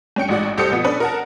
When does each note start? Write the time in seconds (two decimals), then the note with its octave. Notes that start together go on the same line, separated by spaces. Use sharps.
0.16 G2 C#4 G5 C#7
0.29 A1 G#2 F#4 D5 F#5
0.58 C2 G4 A4 C5 D#6 C#7
0.71 B2 F3 B3
0.84 C#4 D4 A4 B4
1.00 A#4 F#5 A5